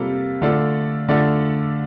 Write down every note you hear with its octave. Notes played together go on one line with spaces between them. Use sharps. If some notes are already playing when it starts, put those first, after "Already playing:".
Already playing: C3 G3 A#3 F4 A4
D3 A3 D4 F4 A4
D3 A3 D4 F4 A4